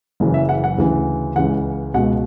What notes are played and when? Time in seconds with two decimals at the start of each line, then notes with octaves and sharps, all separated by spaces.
0.20 F#1 F#2 C#3 E3
0.34 E5
0.49 F#5
0.64 F#5
0.78 D2 C#3 E3
1.36 C#2 C#3 E3 F#5
1.94 C#2 B2 F#5